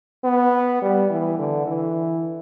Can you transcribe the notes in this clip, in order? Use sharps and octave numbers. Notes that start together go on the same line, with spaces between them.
B3
G3
E3
D3
E3